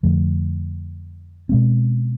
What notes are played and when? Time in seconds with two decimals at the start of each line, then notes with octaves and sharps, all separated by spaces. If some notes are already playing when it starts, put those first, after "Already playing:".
0.03 F2 D3 F3 A3
1.49 B2 G#3 C4